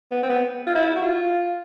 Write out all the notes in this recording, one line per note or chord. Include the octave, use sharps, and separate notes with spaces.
B3
C4
B3
F4
E4
F#4
F4